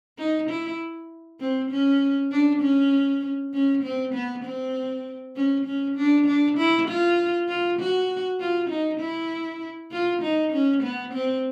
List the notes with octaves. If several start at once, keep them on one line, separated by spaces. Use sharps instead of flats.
D#4
E4
C4
C#4
D4
C#4
C#4
C4
B3
C4
C#4
C#4
D4
D4
E4
F4
F4
F#4
F4
D#4
E4
F4
D#4
C#4
B3
C4